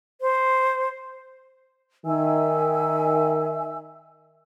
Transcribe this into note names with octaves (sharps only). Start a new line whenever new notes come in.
C5
D#3 E5 G#5 E6